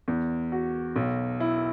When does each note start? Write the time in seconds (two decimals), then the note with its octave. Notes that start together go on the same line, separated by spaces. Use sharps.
0.08 E2
0.52 F#4
0.96 B1
1.40 E4